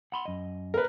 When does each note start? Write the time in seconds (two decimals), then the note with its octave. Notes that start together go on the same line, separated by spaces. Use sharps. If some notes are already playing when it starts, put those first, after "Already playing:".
0.12 F#5 B5 C6
0.25 F#2 D#5
0.74 A#4 B4